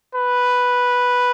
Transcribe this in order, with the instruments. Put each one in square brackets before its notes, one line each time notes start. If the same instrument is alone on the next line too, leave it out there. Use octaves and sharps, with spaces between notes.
[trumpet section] B4